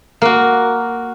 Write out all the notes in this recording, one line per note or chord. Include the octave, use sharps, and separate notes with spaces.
A#3 F#4